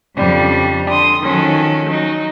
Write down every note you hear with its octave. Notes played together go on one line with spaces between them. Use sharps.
F2 C#3 G3 D4
D3 C6 D#6
D#3 F3 F#3 C#4 A4
F#3 D#4